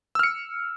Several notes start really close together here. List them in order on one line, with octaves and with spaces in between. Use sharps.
E6 F6 C#7